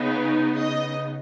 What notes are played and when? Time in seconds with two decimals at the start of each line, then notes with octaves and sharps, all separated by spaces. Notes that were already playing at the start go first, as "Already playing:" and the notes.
Already playing: C#3 B3 D#4
0.57 D#5